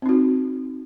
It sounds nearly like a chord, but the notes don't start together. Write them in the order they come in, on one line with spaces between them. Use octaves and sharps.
C4 D#4 F#4